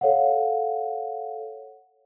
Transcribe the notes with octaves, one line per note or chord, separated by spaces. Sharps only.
A4 C#5 F5 F#5